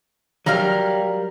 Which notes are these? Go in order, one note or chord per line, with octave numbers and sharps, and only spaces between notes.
F#3 G3 A#4 F5 F6